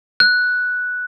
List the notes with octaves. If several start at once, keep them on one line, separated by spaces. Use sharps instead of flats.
F#6